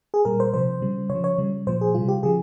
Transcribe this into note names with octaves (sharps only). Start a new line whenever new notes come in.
G#4
A#2 G3 A#4
C5
C3 F3 C5
C#3 G3
C#3 C#5
F3
C#5
C#3 G3
A#2 F3 C5
G#4
C3 G3 F4
G4
C#3 F3 G#4